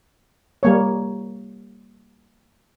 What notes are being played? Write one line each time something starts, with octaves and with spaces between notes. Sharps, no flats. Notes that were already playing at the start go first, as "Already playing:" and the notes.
G3 A#3 C#5